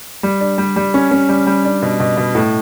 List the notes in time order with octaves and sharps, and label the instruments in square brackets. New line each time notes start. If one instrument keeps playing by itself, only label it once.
[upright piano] G3
D4
G3
G3
C#4
C#4
G3
G3
D4
B2
B2
B2
A2